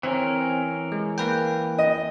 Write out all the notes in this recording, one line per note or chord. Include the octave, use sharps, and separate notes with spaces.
E3 C4 C#4 A#4
G#3
A#3 B4 G5
D#5